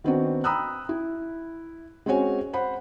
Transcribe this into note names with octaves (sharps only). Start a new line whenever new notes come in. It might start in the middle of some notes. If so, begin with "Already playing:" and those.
D#3 B3 C4 D4 D#4 F#4
G5 A#5 B5 D#6 E6 F#6
E4
G#3 C4 C#4 F#4 C#5 G#5
C5 F#5 B5